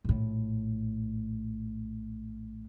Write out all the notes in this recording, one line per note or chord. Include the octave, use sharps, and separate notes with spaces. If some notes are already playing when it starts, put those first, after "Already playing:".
A#1 A2